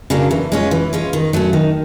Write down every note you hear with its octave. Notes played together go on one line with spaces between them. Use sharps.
C#3 F#3 A#3 D4
E3
G#3 C#4 F4
E3
G#3 C#4 F4
D#3
F#3 A3 C#4
D#3